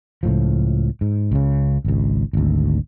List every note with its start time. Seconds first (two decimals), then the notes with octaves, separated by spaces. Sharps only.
0.23 C#2 A2 F3
1.01 G#2
1.32 C#2 C#3
1.85 G#1 C#2
2.33 G#1 D2